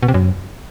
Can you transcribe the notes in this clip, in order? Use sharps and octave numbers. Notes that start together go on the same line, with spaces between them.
B2
C3
F#2